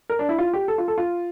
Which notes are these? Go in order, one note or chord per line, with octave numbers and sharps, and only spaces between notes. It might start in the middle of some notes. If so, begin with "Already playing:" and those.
A#4
D4
E4
F4
G4
A4
F4
A4
F4